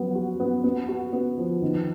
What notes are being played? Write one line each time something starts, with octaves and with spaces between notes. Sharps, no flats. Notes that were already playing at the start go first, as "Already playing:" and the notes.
Already playing: F3 F#3 B3
F#4
B3
B3
F#4
B3
F3
D#3